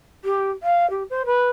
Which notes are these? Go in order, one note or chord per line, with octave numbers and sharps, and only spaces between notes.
G4
F5
G4
C5
B4